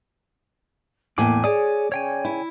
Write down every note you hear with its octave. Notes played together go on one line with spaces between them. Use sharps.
E2 A2 A#3 G#5 D6
G#4 C#5 D5 G#5 D#6
C#3 C#5 G5 G#5
E4